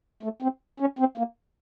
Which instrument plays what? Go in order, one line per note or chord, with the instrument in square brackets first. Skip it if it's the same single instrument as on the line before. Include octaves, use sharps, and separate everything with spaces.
[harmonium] A3
C4
C#4
C4
A#3